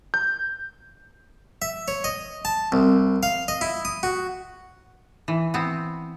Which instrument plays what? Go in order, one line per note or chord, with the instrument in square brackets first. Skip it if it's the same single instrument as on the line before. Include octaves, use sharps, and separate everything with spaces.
[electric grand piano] G6
[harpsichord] E5
C#5
D#5
A5
C2
F5
D#5
E4
D#6
F#4
[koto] E3
B3 C4